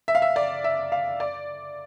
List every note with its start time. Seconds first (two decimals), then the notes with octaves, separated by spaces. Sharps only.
0.08 E5
0.15 F5
0.22 E5
0.36 D5
0.64 E5
0.92 F5
1.20 D5